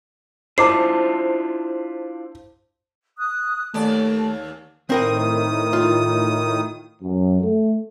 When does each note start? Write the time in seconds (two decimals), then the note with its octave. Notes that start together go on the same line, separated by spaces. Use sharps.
0.58 D4 E4 F4 C5 A5 D6 C7
3.18 D#6 F#6
3.74 D#2 A3 D5 A5
4.90 A2 D#3 C4 A#4 G5 D#6
5.73 F4
7.03 F#2
7.42 A3